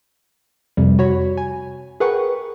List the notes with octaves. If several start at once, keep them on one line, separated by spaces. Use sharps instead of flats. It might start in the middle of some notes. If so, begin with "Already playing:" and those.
F2 C3 G3
F#4 C#5 B5
G#5
G#4 A#4 B4 F#5 G5 C#6